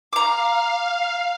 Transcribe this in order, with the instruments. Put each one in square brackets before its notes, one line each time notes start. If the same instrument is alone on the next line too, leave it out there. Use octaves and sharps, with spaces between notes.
[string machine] F5 [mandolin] A#5 D6